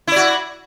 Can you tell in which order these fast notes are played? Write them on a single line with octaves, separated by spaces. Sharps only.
E4 D5 F#4